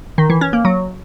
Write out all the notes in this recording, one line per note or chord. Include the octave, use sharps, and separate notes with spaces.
D#3
E3
C#4
A#3
F#3